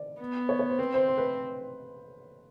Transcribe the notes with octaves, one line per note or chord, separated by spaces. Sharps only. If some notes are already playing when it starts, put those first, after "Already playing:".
Already playing: D5
B3
C#5
C#5
C5
C4 B4
C5
C5
B4